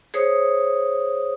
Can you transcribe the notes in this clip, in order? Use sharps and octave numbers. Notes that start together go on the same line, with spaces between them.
G#4 C5 C#5 D#6